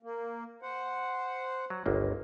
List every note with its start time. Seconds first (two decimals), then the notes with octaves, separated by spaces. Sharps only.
0.03 A#3
0.62 C5 F#5
1.70 F#3
1.86 G1 C#2 A#3